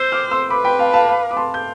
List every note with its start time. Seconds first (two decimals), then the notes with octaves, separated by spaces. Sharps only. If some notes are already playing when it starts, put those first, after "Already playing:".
Already playing: C5 E6 G6
0.12 D6 F6
0.31 C6 E6
0.50 B4 B5 D6
0.65 G5 B5
0.79 F5 A5
0.94 F5 A5
1.08 F5
1.31 D6
1.37 A5 C6
1.54 G6